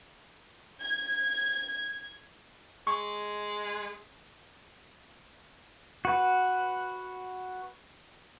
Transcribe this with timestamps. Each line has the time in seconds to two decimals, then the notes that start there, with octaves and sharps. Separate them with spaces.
0.80 G#6
2.87 G#3 C#6
6.05 F#4 B4